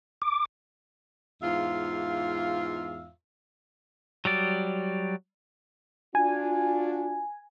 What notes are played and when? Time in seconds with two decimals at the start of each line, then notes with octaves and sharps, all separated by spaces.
0.22 D6
1.42 E2 G#2 F4 E5 F5
4.25 F#3 G3 D5
6.15 D4 F4 F#4 G#5